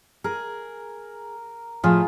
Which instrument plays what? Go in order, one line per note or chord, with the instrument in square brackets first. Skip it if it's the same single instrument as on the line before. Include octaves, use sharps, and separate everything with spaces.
[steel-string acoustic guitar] G#4 [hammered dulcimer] A#4
[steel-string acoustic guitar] A2 F3 [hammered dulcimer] F4 G#4